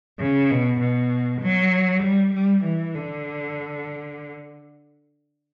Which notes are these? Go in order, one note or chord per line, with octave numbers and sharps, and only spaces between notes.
C#3
B2
B2
F#3
G3
G3
E3
D3